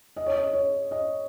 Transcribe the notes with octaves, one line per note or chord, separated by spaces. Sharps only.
D#5
C#5
D#5
C#5
D#5